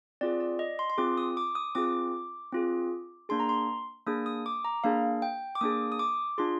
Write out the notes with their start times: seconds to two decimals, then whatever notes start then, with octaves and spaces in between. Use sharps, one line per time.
0.21 C4 F4 G#4 D5
0.40 D5
0.59 D#5
0.79 C6
0.90 C6
0.98 C4 F4 G#4 D6
1.17 D#6
1.37 D6
1.55 D#6
1.75 C4 F4 G#4 D6
2.52 C4 F4 G#4
3.29 A#3 D4 G#4 C6
3.40 A#5
3.49 C6
4.06 A#3 D4 G#4 D#6
4.26 D#6
4.46 D6
4.65 A#5
4.84 A#3 D4 G#4 F5
5.22 G5
5.55 D6
5.61 A#3 D4 G#4 D#6
5.92 D#6
5.99 D6
6.38 D4 F4 G#4 C6